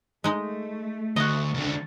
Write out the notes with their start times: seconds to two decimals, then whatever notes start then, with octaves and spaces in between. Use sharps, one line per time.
0.24 G#3 A3 D#4
1.16 D2 F#4 D#5
1.54 C#2 D3